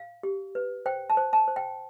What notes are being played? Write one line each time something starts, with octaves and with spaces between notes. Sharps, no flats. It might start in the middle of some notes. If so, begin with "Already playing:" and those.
Already playing: F5
G4
B4
C5 G5
A5
C5
A5
C5
G5